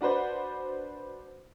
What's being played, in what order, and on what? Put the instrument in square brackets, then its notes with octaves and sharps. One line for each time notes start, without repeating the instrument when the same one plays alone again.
[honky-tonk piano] D4 F#4 B4 C5 D5